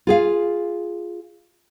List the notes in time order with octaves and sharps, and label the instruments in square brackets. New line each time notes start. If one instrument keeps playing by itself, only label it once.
[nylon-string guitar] F4 G#4 F5